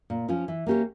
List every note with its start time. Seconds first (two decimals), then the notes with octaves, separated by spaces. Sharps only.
0.10 A#2
0.28 F3 C#4 F4
0.48 E3
0.67 A#3 C#4 G4 C#5